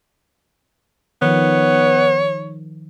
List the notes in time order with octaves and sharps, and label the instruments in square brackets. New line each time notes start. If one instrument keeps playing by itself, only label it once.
[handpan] D#3 F3 [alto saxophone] B3 [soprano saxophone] C#5